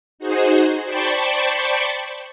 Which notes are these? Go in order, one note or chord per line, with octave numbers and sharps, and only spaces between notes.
D#4 F#4 G#4 C5
C5 D5 G5 A5 B5 C#6